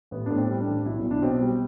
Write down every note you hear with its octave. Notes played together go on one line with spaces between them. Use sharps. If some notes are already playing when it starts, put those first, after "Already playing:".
A1 B3
A2 D4
C4
G3
D4
A1
B1 E4
B1
D4
B2 C4
G3